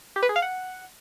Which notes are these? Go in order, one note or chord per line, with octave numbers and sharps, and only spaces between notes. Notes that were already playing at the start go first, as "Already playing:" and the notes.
G4
B4
G#4
F5
F#5